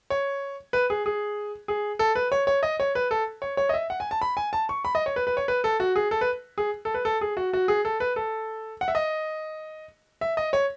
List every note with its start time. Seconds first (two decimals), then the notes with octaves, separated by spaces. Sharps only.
0.10 C#5
0.73 B4
0.90 G#4
1.06 G#4
1.68 G#4
1.99 A4
2.15 B4
2.32 C#5
2.47 C#5
2.63 D#5
2.80 C#5
2.95 B4
3.11 A4
3.42 C#5
3.57 C#5
3.69 D#5
3.74 E5
3.90 F#5
4.00 G#5
4.11 A5
4.22 B5
4.37 G#5
4.53 A5
4.69 C#6
4.85 B5
4.95 D#5
5.06 C#5
5.16 B4
5.27 B4
5.37 C#5
5.48 B4
5.64 A4
5.80 F#4
5.96 G#4
6.11 A4
6.21 B4
6.58 G#4
6.85 A4
6.94 B4
7.05 A4
7.21 G#4
7.37 F#4
7.53 F#4
7.68 G#4
7.85 A4
8.00 B4
8.16 A4
8.81 F#5
8.88 E5
8.95 D#5
10.21 E5
10.37 D#5
10.53 C#5